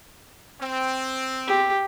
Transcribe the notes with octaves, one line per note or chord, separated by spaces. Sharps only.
C4
G4